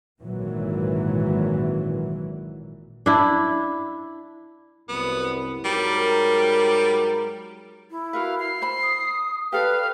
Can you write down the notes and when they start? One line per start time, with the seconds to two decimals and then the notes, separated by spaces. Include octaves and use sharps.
0.23 G#1 A#2 E3 F#3
3.06 D4 E4
4.89 C2 F#2 B3
5.65 G#2 F#3 G3 A#4
7.90 E4
8.13 F#4 A#4 B4 F5
8.39 C7
8.62 C5 B5
8.83 D#6
9.52 G4 A4 B4 D5 F5